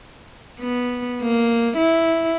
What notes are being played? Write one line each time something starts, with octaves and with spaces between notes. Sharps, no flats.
B3
A#3
E4